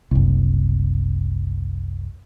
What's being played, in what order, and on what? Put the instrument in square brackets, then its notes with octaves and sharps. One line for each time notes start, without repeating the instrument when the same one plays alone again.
[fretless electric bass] F#1 C2